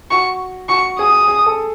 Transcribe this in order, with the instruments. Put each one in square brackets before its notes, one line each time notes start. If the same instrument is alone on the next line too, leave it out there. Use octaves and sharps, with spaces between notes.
[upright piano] F#4 [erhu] C#6
[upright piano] F#4 [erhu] C#6
[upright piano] G#4 [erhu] D#6
[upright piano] G#4
A4